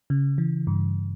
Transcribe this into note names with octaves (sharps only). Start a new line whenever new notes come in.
C#3
E3
G2